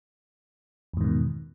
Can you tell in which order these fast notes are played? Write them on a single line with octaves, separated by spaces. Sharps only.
E2 G#2 D#3 B2